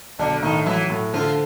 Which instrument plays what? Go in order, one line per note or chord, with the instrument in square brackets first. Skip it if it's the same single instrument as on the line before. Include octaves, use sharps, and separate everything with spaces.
[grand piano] B1 [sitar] D3 D4
[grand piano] A2 [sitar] D#3 D#4
[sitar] E3 E4 [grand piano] F#3
[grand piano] A2
[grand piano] D3 [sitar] F3 F4